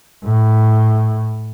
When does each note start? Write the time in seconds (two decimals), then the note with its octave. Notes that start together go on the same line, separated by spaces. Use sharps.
0.23 A2